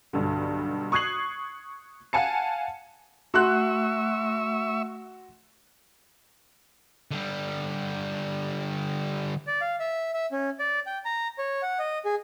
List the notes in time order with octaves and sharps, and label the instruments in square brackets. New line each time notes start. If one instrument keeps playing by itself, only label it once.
[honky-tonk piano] B1 G2 D3
C#6 D#6 F#6 G#6 C7 F#7
F5 F#5 G#5 A5 C#7
[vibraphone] A3 F#5 [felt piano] F#4 C6 F#6 [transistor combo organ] E5 C#6 E6
[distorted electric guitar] D3 G3
[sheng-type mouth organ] D5
F5
E5
E5
C#4
D5
G5
A#5
C#5
F#5
D#5
G#4